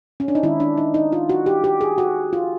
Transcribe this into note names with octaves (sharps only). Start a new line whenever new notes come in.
C#4
D4
D#4
D#3 G#3 C#4 E4
D4
D#4
D#4
F4
F#4
G4
G4
G#4
F#4
F4